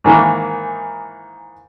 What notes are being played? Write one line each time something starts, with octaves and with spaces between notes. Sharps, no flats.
G#2 D#3 E3 A#3